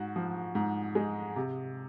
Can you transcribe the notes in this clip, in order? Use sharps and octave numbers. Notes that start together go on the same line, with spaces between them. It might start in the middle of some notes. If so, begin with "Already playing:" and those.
Already playing: G#2 F#4
F3
G#2
G#3
C3